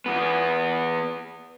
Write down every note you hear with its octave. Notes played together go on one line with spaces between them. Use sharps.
E2 B3